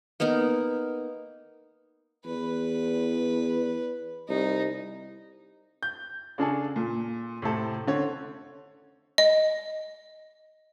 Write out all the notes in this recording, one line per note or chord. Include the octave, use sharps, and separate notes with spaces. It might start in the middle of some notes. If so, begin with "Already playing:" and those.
A#3 B3 D#4 A#4
E2 B4
C2 D#4
G6
C#3 D4 G#4 A4
A#2
A2 C3 C4 E4 A4
D3 C4 C#5
D#5